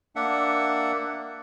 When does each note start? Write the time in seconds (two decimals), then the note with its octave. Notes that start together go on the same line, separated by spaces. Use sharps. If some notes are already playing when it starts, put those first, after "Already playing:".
0.16 A#3 D4 E5 F#5